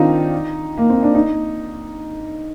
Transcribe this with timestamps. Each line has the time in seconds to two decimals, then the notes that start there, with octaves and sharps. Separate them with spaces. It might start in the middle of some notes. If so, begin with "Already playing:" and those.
Already playing: D#3 C4 D4 D#4 F4
0.78 A#3
0.90 C4
1.03 D4
1.15 D#4